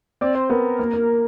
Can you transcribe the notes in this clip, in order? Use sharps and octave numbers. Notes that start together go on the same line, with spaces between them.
C4 D5
C5
B3 A#4
A#3
A#3